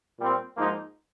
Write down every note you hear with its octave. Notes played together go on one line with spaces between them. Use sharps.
A#2 G3 C4
G#2 F3 A#3 D#4